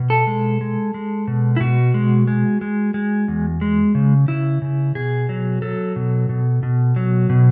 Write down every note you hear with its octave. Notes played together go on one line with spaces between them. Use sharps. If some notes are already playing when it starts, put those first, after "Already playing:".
Already playing: B2
A4
G#3
G#3
G#3
B2
E4
B2 F#4
G#3
G#3
G#3
G#3
E2
G#3
C#3
C#3 E4
C#3
B2 G#4
F#3
F#3 A4
B2
B2
B2
F#3
B2